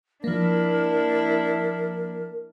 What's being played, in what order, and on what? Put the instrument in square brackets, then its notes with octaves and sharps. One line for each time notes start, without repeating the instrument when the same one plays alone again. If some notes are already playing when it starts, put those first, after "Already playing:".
[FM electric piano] F3 A#3 [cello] D4 E4 [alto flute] A#4